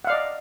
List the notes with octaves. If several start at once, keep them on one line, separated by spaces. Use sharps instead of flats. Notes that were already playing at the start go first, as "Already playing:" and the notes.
D5 D#5 F5 F#5